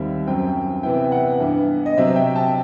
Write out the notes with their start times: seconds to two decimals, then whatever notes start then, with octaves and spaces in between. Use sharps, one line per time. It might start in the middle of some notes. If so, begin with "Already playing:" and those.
Already playing: D#2 D#3 G3 C4 E5
0.27 F#2 F#3 C4 G5
0.83 C3 E3 B3 E4 G5
1.12 F#5
1.40 G2 E3 B3
1.86 D#5
1.97 C3 F#3 C4 E5
2.16 G5
2.36 A5